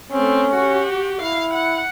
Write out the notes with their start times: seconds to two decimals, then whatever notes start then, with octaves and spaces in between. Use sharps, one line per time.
0.12 A3 C4 C#4
0.54 F#4 G4
1.21 E4 F5
1.53 F#5